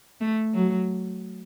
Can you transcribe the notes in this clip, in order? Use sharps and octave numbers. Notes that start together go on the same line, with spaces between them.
A3
F#3